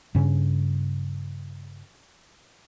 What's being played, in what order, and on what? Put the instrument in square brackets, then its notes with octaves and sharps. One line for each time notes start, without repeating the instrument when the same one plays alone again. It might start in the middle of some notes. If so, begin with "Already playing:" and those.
[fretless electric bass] G2 C#3 C#4